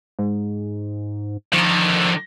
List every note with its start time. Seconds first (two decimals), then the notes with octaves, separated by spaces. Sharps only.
0.19 G#2
1.53 D3 D#3 F3